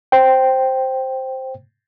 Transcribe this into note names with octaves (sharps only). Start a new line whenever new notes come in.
C5 G5